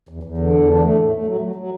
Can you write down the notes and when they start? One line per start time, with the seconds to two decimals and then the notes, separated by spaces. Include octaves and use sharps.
0.09 E2
0.23 E2
0.37 D3
0.53 E2
0.68 D4
0.82 A3
0.97 A2
1.11 A3
1.26 F#3
1.41 F#3
1.55 F#3